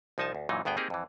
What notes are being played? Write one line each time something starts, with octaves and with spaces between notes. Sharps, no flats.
C2 F3 D#4 G#5 A5
D2
F#2 A#2 E3 F#3 D#4
D2 G2 B3 G#4 G5
A#3 C4 D#4 G4 G#4 A#4
F2 E3